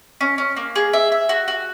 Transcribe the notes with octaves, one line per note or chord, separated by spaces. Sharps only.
C#4
C#4
A#3
G#4
E5
E5
F#4
F#4